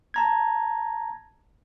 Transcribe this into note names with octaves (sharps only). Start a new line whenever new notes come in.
A5 A#5 G#6